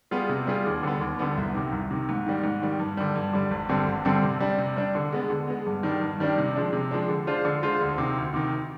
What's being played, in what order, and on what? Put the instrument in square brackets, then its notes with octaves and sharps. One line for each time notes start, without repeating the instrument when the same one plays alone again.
[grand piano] G3 B3 F4 G#4
C3
G3 B3 F4 G#4
D#2
D3 G3 B3
D#2
D3 G3 B3
C2
C3 D#3
C2
C3 D#3
G#2
D#3 G3
G#2
D#3 G3
G2
D3 G3
G2
D3 G3
G#1
G2 D3 G3 C4
G#1
G2 D3 G3 C4
C3
G3 D4
C3
G3 D4
D3
G#3 B3
D3
G#3 B3
G2
D#3 G3 D4
G2
D#3 G3 D4
C3
F3 G#3 D4
C3
F3 G#3 D4
D3
G#3 D4 F4 C5
D3
G#3 D4 F4 C5
D2
C3 D#3
D2
C3 D#3